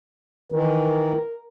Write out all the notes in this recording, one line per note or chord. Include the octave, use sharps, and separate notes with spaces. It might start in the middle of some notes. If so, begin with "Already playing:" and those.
D#3 E3 A#4